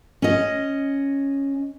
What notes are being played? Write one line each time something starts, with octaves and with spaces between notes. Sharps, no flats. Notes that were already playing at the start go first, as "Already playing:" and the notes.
C#4 D#5